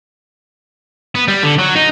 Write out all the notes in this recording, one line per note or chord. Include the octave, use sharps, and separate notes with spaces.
B3
G3
D3
F#3
D#4